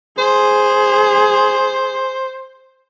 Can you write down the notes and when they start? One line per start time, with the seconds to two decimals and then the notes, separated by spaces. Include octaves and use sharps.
0.18 G#4 C5